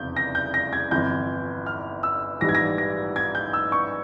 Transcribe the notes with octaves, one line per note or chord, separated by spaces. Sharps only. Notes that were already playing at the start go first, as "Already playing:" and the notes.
Already playing: F1 E2 C#3 G6
A#6
G6
A#6
G#6
G1 F2 E3 G6
F6
E6
A#1 G#2 E3 G3 A#6
G#6
A#6
A#6
G#6
G6
E6
C#6